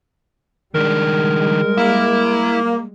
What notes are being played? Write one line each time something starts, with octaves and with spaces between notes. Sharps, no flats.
D#3 G3 G#3 D4 A#4
A#3 E4